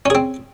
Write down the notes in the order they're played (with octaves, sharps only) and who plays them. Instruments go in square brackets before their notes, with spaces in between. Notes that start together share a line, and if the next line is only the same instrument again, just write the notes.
[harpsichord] C#4
G#4
C4